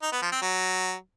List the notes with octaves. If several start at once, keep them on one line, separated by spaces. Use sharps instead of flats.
D#4
B3
F3
C4
F#3